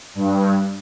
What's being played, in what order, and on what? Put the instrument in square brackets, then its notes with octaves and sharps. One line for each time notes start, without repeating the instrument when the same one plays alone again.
[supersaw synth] G2